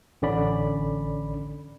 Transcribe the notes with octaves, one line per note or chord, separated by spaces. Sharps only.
A1 D3 C#4 D5 B5